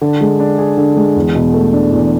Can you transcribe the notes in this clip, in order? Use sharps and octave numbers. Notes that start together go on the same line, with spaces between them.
D3
G#3
D4
G#4
D3
G#3
E2
B2
A3
D4
E2